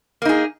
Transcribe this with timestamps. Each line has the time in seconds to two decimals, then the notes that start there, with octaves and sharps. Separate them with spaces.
0.22 A#3
0.25 D#4
0.29 G#4